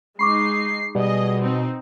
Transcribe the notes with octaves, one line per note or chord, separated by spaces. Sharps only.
G#3 D#4 B5 C#6 D6 C7
B2 G3 G#4 D#5
C4 D#4